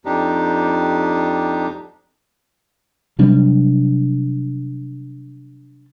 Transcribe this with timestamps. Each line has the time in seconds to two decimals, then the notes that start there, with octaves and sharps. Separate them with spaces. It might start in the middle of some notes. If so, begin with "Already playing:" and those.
0.05 F2 D4 D#4 G4
3.19 C3 F#3 G3 D4